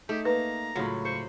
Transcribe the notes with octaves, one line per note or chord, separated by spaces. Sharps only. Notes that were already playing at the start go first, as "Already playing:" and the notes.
A3 D#4 G4
A#3 D#4 B4 A#5
C#2 A2 F#3 F4
C5 C#6